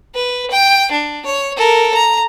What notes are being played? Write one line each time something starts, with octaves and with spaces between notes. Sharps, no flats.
B4
G5
D4
C#5
A4 A#4
A#5